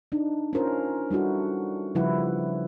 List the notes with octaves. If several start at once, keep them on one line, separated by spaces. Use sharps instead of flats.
D4 D#4
C#4 F4 A#4 C5
G3 D4 E4 F#4 A4
C#3 F3 G3 E4 B4 F#5